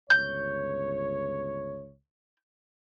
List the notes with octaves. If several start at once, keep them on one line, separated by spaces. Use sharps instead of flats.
G1 C#2 C#5 G6